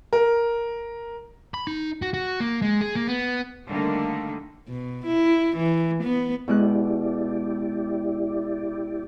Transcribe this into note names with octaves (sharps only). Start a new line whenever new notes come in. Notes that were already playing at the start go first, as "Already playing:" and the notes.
A#4
B5
D#4
F#4
F#4
A#3
G#3
G#4
A#3
B3
D3 D#3 G3 A3 A#3
B2
E4
E3
B3
B2 G#3 E4 G4 D5 F#6